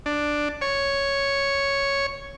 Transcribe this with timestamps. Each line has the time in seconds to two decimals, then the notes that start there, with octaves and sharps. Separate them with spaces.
0.06 D4
0.61 C#5